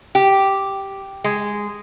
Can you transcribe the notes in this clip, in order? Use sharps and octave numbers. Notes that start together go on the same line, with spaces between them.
G4
G#3